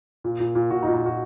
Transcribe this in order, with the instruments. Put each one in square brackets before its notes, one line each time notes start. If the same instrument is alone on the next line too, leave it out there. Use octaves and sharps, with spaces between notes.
[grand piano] A#2
A#2
A#2
A#2 F#4
D#4
A#2
D#4
A#2 F#4